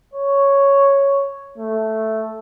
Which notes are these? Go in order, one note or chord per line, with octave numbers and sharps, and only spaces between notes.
C#5
A3